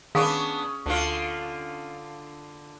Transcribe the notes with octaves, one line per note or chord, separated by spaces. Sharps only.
D#3 B3 C#4 D4 G#4 F5 C#6 D#6
D2 D3 F4